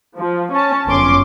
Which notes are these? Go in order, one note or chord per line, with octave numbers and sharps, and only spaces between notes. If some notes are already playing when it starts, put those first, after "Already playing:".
F3
C#4 A5
G1 F#2 C#4 C6 D6